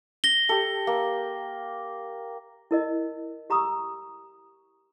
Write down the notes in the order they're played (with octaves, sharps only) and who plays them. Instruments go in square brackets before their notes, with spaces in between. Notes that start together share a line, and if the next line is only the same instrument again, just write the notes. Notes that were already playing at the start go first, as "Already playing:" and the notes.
[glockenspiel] A#6 G7
[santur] G4 A4
A#3
[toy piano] E4 A#4 D#5
G4 A#5 C#6 D#6 E6